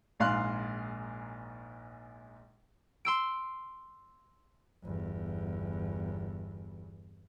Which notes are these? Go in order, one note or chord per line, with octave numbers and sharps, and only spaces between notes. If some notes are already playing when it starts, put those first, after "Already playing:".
A#1 G#2 F5 C6 F#6
C6 E6 D7
G1 E2